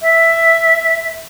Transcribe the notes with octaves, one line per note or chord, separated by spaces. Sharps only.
E5